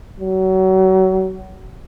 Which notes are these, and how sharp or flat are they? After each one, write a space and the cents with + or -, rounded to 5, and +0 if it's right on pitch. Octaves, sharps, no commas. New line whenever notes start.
F#3 +30